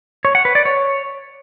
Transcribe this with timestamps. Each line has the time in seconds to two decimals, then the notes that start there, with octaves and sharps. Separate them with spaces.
0.25 C#5
0.35 F#5
0.45 B4
0.55 D5
0.65 C#5